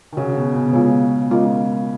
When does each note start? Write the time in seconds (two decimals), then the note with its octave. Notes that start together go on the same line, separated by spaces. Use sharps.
0.13 D#3
0.17 C#3 F#4 C#5 F#5
0.36 B2
0.55 C#3
0.66 B2
0.73 C#3 G#3 B3 F4 G#4 C#5
1.31 G#3 C#4 F4 A#4 D#5